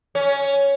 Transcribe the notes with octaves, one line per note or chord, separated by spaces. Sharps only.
C#4